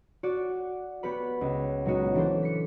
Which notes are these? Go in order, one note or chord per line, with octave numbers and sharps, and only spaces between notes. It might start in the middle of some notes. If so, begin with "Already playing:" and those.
F#4 D5
B3 F#4 G4 B4 B5
C#2
A#2 F#3 G#3 B3 D#4 F#4
E3 D4 F#4 A4 C5
B6 C#7